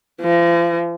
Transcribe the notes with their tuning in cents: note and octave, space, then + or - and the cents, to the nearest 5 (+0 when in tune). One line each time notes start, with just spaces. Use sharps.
F3 -35